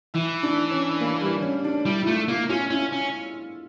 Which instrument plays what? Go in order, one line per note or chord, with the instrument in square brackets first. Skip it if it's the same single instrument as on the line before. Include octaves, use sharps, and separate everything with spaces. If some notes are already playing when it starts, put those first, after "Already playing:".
[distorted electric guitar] E3 [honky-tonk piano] E4
[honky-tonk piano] D4
C#4
A#3
G3
C#4
D4
[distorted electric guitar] G3 [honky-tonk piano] E4
[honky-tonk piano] E4
[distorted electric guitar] A3 [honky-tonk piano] F4
[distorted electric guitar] A#3 [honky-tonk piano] E4
[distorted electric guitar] C#4 [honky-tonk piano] F4
[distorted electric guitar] C#4 [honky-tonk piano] E4
[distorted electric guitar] C#4